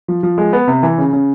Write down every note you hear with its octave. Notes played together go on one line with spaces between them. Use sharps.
F3
F3
G#3
B3
C3
E3
C#3
C#3